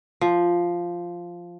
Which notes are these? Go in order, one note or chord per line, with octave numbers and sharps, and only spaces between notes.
F3